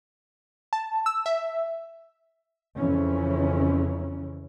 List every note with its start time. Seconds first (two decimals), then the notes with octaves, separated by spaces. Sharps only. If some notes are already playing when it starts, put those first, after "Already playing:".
0.73 A5
1.06 E6
1.26 E5
2.77 F2 C#3 E3 C#4